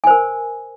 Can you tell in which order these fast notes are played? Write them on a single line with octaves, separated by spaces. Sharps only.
G#5 C5 A#4